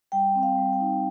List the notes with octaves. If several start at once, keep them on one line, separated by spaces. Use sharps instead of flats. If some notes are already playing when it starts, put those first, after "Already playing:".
G3 G5
C4
F5
G3
G5
D#4